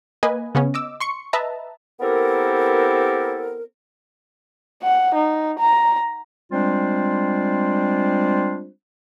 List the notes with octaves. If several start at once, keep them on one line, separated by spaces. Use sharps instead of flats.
A#3 B4 D#5 G#5
C#3 B3 C#4
D#5 D6 E6
C6 C#6 C#7
B4 D#5 E5 A5 A#5
B3 C4 E4 G4 A4 A#4
F#5
D#4
A#5
G3 G#3 C4 D4 F4 C5